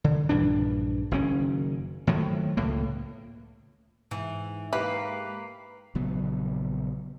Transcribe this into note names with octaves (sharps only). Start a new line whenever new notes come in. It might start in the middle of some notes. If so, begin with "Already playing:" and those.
D3
A#1 G2 E3 D4
F#1 D#3 C#4
A2 D#3 F3 F#3
C#2 A2 A#3
G#2 E3
A#3 E4 G4 B4
A#1 C#3 F#3 B3